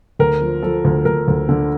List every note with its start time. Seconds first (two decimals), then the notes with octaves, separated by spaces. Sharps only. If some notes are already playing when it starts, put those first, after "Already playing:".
0.19 D2 A#4
0.42 F3
0.62 F3 A4
0.85 D2
1.05 D2 A#4
1.28 D2
1.49 D3